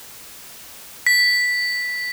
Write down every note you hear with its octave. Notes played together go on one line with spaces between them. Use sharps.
B6